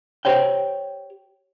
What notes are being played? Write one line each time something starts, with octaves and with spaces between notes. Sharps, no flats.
G4 C5 C#5 G5